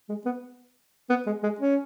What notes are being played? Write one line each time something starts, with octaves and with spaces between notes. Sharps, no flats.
G#3
B3
B3
G#3
G#3
C#4